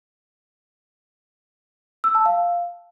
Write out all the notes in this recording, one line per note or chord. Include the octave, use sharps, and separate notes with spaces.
E6
A5
F5